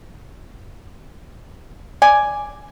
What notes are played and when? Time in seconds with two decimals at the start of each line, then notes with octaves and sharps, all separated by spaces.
2.02 D5 G#5